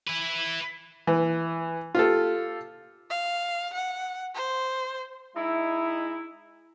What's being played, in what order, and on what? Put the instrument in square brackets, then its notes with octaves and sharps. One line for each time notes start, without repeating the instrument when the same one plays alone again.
[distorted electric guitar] E4 B4
[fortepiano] E3
F4 G4 A4
[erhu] F5
F#5
C5
[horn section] G#3 D#4 E4